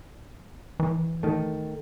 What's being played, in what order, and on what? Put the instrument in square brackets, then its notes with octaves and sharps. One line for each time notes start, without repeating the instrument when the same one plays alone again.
[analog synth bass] E3
[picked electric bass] D#3 A3